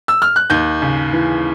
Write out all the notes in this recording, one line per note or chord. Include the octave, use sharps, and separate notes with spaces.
E6
F6
F#6
D#2 G6
C#3
E3